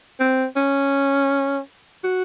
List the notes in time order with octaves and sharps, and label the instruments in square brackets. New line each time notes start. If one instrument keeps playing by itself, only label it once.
[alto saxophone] C4
C#4
F#4